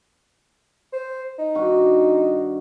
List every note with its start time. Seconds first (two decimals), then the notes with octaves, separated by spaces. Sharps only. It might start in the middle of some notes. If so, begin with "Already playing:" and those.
0.93 C5
1.39 D#4
1.55 G2 D#3 F#4